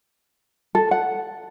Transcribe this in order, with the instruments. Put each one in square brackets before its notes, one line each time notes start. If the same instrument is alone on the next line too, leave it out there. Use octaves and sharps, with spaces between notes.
[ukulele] A4
F#5